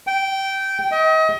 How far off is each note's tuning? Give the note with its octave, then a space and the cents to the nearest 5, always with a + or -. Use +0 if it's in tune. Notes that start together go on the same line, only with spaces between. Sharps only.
G5 -15
D#5 +35